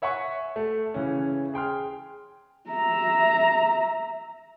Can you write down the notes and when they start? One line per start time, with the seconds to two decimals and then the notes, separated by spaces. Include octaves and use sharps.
0.02 C#5 E5 F#5 G#5 C#6
0.56 A3
0.94 C#3 E3 C#4
1.54 G#4 G5 C6 F6
2.70 E5 A#5